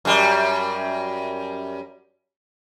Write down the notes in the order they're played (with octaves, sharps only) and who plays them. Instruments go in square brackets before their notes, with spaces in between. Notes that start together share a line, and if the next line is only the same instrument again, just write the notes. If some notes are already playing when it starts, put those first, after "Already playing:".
[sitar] F#2 G3